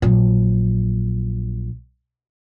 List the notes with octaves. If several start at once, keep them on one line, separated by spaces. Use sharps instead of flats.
A#1 F#3